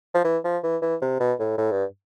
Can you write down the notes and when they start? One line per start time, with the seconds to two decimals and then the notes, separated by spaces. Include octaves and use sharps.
0.14 F3
0.24 E3
0.44 F3
0.63 E3
0.82 E3
1.02 C3
1.20 B2
1.40 A2
1.58 A2
1.71 G2